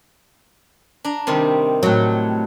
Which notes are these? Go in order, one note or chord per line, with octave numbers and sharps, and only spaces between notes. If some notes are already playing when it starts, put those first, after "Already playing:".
D4 A#5
C3 D#3 G3
A2 F#3